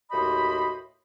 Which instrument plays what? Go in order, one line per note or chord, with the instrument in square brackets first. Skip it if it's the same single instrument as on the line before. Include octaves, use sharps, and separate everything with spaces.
[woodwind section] D#2 A2 F#4 C5 D#5 B5